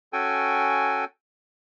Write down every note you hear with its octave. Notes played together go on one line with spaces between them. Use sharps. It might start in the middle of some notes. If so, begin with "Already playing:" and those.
C#4 F#4 A4 G5 G#5